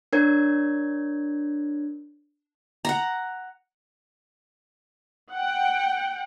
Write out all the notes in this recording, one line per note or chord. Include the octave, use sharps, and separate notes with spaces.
D4 A#4 C#5 G#6
F#5 A#5
F#5 G5